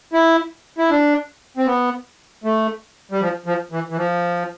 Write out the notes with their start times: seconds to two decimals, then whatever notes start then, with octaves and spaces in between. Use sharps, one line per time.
0.13 E4
0.78 E4
0.91 D4
1.57 C4
1.67 B3
2.44 A3
3.12 G3
3.21 F3
3.46 F3
3.72 E3
3.90 E3
3.97 F3